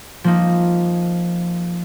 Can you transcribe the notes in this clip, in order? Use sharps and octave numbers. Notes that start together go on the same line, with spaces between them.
F3 A#3 D#4